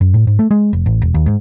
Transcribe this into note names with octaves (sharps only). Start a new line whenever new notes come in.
F#2
A2
G#2
A3
G#3
F1
A1
E1
D#2
G#2